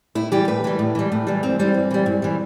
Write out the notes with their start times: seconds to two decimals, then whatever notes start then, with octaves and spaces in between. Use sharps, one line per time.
0.15 A2 E4
0.32 E3 G3 G4
0.48 A2 B4
0.64 E3 G3
0.79 A2
0.95 E3 G3
1.12 A2
1.27 E3 G3
1.43 G2 C4
1.59 E3 G3 C4
1.74 G2
1.91 E3 G3
2.06 G2
2.22 E3 G3